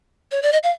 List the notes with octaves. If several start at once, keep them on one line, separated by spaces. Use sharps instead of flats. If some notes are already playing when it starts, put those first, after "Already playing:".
C#5
D5
D#5
F5